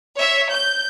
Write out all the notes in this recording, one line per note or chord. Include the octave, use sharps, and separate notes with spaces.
C#5 E5
G6